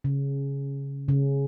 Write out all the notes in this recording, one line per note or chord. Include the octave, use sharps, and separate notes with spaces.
C#3
C#3